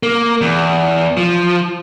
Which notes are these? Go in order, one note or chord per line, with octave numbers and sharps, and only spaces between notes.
A#3
E2
F3